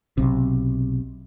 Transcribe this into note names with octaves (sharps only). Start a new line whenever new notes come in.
B1 C3